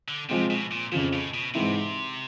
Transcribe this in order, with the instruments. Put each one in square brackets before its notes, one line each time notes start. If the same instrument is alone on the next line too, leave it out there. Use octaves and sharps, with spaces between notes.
[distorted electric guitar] D3
[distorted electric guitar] C3 [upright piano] F3 G#3 C4
[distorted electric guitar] B2
A#2
[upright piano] F2 C#3 F3 [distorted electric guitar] A2
[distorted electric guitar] A2
B2
[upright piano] G#2 E3 G#3 C4 E4 [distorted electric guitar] C3